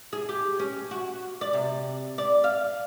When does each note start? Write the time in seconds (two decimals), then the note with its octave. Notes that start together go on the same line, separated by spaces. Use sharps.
0.13 G#4
0.29 G4
0.59 C#4
0.91 F#4
1.41 D5
1.53 C3
2.18 D5
2.44 F5